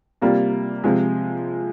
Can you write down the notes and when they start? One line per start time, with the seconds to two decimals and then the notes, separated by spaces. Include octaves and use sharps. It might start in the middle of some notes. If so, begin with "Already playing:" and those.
0.22 C3 G3 A#3 F4
0.84 C3 F3 G#3